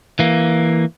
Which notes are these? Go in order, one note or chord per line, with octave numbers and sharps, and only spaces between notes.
E3 A#3